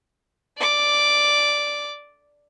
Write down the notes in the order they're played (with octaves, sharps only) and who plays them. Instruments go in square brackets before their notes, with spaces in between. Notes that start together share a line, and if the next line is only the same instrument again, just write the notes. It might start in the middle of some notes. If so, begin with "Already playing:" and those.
[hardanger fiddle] D5 D6